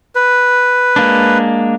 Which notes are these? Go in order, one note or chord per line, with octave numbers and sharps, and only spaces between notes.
B4
G#3 A#3 D4